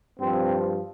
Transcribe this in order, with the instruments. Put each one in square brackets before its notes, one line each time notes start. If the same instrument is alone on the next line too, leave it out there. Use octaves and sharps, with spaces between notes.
[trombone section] G2 F3 C4